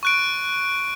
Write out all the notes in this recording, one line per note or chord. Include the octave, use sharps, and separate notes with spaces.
C#6 F#6 D7